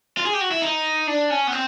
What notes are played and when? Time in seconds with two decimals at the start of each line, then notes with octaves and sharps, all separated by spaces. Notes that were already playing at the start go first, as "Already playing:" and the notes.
0.17 F4
0.26 G#4
0.34 G4
0.41 F#4
0.51 E4
0.62 D#4
1.07 D4
1.30 C#4
1.47 B3
1.52 C4